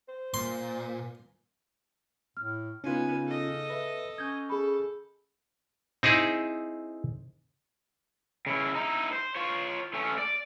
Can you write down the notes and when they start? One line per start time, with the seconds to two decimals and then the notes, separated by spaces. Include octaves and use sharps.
0.08 C5
0.34 A#2 C6
2.37 A2 F6
2.84 C#3 B3 C#4 D#4 F4 G#5
3.27 A4 D#5
3.70 B4 E5
4.18 C#4 D#6 G6 G#6
4.49 G#4 A4 B5
6.03 C4 D#4 E4 G#4
8.46 C#3 E4
8.75 D#4 E4
9.12 C5
9.35 F4 C#5
9.94 A3 C#4
10.18 D5